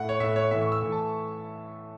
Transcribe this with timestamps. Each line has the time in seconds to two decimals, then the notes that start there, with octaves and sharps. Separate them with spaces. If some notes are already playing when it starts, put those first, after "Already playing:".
Already playing: A2 A3 F#5
0.09 C#5
0.20 A2 A3 E5
0.36 C#5
0.51 A2 E3 A3 E5
0.61 C#6
0.72 E6
0.82 A2 E3 A3
0.92 A5